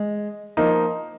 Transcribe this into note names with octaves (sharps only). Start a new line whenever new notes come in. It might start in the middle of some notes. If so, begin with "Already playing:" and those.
Already playing: G#3
F3 A#3 D#4